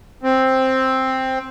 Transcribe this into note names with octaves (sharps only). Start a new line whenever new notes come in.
C4